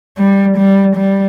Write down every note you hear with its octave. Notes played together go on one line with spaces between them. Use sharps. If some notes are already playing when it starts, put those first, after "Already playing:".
G3
G3
G3